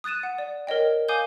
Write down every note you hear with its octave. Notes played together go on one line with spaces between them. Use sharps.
D#6 F#6 A6 D#7 E7
F#5
D5
A#4 C#5 D#5 G5
F5 G#5 D6 D#6 G6 G7